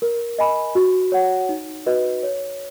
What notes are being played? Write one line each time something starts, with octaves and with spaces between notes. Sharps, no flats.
A#4
D#5 G#5 B5
F#4
C#5 F#5
D#4
F#4 B4 D#5
C#5